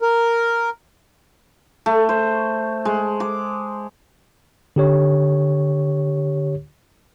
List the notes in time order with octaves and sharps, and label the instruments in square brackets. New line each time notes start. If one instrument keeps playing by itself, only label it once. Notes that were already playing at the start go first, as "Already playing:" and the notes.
[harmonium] A#4
[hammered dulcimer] A3
C5
G#3
D6
[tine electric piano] D3 G4 C#5